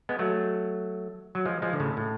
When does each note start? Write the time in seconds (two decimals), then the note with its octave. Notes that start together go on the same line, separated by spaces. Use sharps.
0.09 G#3 B3
0.19 F#3 A3
1.35 F#3
1.46 F3 G#3
1.62 F3 G#3
1.73 D3
1.80 A2 C#3
1.97 A2